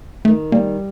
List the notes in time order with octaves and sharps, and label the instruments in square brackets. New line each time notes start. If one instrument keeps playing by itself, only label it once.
[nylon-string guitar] D#3 [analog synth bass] A3
[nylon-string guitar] G3 [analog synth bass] A#3